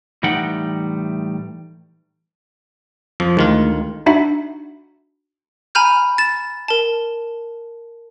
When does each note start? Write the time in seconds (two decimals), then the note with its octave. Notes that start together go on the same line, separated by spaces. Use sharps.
0.23 A2 E3 G3 D#4 F#5 G5
3.20 F2 F3
3.37 D2 D#3 G#3 A3 F4
4.06 D4 D#4 F#4 E5 F#5 B5
5.75 G#5 A#5 B5 F6 G6
6.18 A6 E7
6.68 A#4 A5